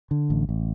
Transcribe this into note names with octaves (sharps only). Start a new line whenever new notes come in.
D3
A1
A1